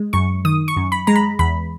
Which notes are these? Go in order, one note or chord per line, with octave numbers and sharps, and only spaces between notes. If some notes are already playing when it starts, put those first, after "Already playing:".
Already playing: G#3
F#2 C#6
D#3 D#6
C#6
F#2
B5
G#3 A#5
B5
E2 B5